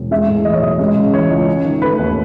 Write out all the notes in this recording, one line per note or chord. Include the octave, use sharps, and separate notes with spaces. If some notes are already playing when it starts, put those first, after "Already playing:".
Already playing: E1
G#3 E5
A2
E3 D#5
C#5
B1 D#5
G#3
C#3
E3 C#5
C#2
C#4
D#3
A3 B4
D#2